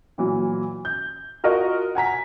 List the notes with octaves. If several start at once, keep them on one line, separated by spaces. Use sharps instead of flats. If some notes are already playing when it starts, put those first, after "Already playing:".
A#2 E3 F#3
G6
F4 F#4 A#4 D#5 C#6
F#5 G#5 A#5 B6